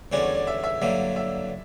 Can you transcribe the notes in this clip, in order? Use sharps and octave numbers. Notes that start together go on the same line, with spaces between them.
E2 D3 G3 C#4 F#4 D5
C#5
D5
E5
E5
G2 D3 F#3 A#3 E5
E5